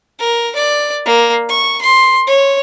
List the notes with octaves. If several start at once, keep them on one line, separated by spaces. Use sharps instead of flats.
A#4
D5
A#3
C#6
C6
C#5